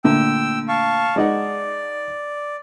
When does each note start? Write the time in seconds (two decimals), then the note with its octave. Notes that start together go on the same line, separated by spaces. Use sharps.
0.04 A#2 D3 A3 G5 E6
0.68 F5 A5 C#6
1.16 G#3 D#4 D5 F#5